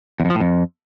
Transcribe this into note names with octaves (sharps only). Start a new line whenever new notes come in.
E2
F2
F3
A2
F2